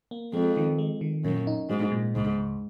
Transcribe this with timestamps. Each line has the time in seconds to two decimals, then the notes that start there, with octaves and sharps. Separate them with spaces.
0.11 A#3
0.33 F2 G#3
0.57 D#3
0.78 G#3
1.01 D#3
1.24 F#2 A#2
1.47 D#4
1.69 G#2 F#3
1.92 A#2
2.15 C#2 G#2
2.38 C#2